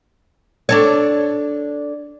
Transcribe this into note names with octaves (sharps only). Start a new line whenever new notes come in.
D4 A4 C#5